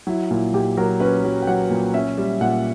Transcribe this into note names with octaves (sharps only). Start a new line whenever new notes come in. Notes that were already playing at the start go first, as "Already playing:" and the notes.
F#3 E4
A#2 E4
A#2 G4
F#3 A#4
C#4 B4
F#3
G5
F#3 F#5
A#2
C#4 E5
G3
A#2 F#5